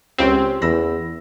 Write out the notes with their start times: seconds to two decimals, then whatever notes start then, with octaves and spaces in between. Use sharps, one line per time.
0.18 C#2 C4 C#4 G4
0.62 E2 B5 E6 A#6